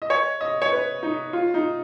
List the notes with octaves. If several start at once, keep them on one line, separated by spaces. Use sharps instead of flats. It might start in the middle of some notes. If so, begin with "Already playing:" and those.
D#5
C#5
D#5
C#5
B4
D#4
F4
D#4